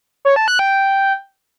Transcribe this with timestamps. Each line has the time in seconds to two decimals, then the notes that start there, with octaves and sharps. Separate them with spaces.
0.25 C#5
0.36 A5
0.48 F#6
0.59 G5